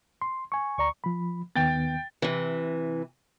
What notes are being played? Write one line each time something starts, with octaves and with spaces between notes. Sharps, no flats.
C6
G#5 C#6
D2 D5 A#5 C#6
F3 B5
D#2 D#3 B3 G5 A6
C3 E3